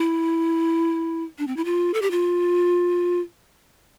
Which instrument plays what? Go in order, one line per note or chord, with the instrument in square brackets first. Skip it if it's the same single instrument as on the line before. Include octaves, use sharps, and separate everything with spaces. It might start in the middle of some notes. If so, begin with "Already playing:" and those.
Already playing: [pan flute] E4
D4
C4
E4
F4
A4
G4
F4